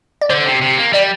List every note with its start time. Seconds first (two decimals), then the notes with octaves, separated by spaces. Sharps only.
0.21 D5
0.30 D3 C5
0.46 C3
0.62 C3
0.78 A#3
0.93 G3 D5